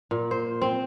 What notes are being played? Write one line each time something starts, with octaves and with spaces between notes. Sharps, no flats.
A#2
C5
C4